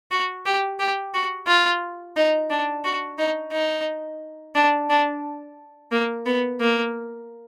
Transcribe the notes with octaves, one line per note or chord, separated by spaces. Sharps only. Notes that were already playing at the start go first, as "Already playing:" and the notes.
F#4
G4
G4
F#4
F4
D#4
D4
F#4
D#4
D#4
D4
D4
A#3
B3
A#3